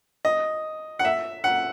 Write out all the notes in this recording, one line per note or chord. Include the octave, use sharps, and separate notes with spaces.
D#5
F#5
E5
F#5